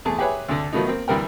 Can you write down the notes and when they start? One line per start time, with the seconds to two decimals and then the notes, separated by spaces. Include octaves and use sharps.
0.05 E2 A3 G#4 A5
0.19 G4 G#4 B4 C#5 E5 G#5
0.48 D2 D3
0.72 D#3 F3 F#3 A3 B3 D#4
0.87 A#3 C4
1.08 D2 E3 G3 A#4 G5